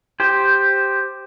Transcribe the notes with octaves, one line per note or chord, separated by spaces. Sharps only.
G4 C5 G5